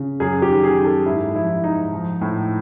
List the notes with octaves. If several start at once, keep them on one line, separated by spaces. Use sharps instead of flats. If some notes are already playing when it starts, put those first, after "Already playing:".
Already playing: C#3
F#2 G#4
G4
D#3
G#4
D#3
A4
G#2 E4
F3 E4
G#2 D#4
F3
A2